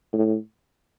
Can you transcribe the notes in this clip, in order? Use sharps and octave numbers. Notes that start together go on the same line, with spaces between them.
A2